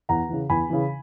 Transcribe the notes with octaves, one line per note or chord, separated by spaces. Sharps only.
E2 F#5 A#5
C#3 E3
E2 G#5 B5
C#3 E3